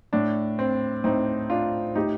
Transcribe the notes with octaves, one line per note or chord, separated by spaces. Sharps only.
A2 D4
C4
A2 C4 D#4
D4 F4
A2 D#4 G4